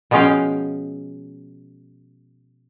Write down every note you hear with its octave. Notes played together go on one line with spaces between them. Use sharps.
B2 F3 G#3 C#4 F5 G5